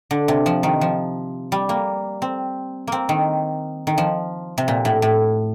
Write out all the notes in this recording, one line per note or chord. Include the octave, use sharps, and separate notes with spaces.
D3
C3
F3
D#3
F3
G3
A#3
C4
A#3 C4
D#3
D#3
F3
C3
A#2
A2
A2